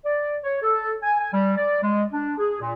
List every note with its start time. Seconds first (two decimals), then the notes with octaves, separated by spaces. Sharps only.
0.04 D5
0.44 C#5
0.62 A4
1.02 G#5
1.19 G#5
1.33 G3
1.56 D5
1.82 G#3
2.13 D4
2.38 G#4
2.60 A#2